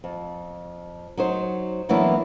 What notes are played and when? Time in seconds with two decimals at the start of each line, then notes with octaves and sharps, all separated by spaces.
0.04 F2
1.17 F#3 D#4 C5
1.89 E3 F#3 A#3 B3 D4 E4